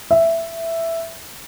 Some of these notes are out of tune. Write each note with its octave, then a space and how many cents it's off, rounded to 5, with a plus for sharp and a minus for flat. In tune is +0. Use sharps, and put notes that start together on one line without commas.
E5 +5